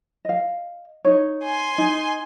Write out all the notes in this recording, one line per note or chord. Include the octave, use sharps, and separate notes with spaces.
D#5 F5
D#4 C#5
G#5 C6
D#4 D#5